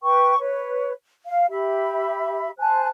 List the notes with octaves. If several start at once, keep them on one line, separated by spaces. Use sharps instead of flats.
B4 G5 C#6
B4 C#5
F5
G4 E5 B5
C5 G#5 A5 F#6